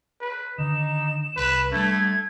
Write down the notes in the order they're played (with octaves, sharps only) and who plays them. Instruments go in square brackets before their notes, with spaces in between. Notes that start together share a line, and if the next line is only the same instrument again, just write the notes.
[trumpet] B4
[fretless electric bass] D3 D#3 [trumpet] D#4 [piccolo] E7
[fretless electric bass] C2 [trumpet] B4
[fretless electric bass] G3 D4 [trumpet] A3 [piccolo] G#6